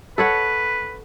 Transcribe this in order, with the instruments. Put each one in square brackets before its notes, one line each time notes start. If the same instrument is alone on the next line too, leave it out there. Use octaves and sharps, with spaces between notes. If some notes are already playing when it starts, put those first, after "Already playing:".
[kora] A4 C#5 F#5 [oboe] B4